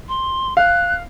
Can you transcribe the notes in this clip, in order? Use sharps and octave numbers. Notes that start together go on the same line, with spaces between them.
C6
F5 F#6